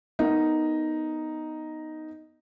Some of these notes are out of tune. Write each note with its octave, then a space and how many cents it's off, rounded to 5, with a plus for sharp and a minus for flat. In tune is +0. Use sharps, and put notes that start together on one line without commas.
B3 +0 D#4 +0 A#4 -15